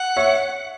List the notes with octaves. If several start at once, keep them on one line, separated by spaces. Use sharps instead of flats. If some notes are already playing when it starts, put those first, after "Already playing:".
Already playing: F#5
C#5 E5